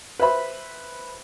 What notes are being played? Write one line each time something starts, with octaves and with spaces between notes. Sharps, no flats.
B4 C5 E5 B5